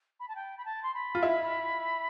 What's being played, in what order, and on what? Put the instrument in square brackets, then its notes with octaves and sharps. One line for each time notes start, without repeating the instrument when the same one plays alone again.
[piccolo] B5
A5
G5
B5
A5
C6
B5
[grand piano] F4
E4